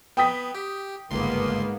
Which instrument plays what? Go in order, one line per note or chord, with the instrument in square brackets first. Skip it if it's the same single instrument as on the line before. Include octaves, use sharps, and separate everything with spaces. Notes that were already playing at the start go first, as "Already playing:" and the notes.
[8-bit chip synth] B3 [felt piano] G5 D#6 B6
[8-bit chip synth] G4
[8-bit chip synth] G1 C#2 C6 [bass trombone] G#2 [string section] A#3 B3